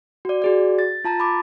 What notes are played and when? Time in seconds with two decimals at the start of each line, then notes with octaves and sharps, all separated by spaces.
0.25 F#4 D5
0.42 F#4 G#4 D5
0.79 A6
1.04 F4 A5 A#5 A6
1.20 B5 D6